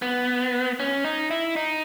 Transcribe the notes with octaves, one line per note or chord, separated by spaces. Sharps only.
B3
C#4
D#4
E4
D#4